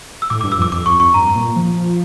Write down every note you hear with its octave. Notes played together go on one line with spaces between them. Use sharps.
E6
A2 D6
G2 D6
E6
F2 D6
F2 D6
F2 C#6
F2 C#6
G2 A#5
A#2
F3